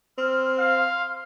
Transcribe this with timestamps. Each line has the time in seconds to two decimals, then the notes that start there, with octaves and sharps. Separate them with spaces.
0.18 C4 C6 F6
0.59 F5